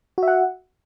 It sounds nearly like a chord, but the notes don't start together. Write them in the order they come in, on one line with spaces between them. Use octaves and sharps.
F#4 E5 F#5